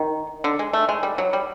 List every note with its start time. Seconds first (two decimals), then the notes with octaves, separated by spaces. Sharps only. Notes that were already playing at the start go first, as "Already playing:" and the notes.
Already playing: D#3
0.44 D3
0.59 G#3
0.73 A3
0.89 G#3
1.03 G3
1.18 F#3
1.33 G3